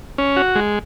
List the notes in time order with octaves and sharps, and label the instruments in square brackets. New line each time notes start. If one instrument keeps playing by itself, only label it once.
[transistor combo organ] C#4
F#4
G#3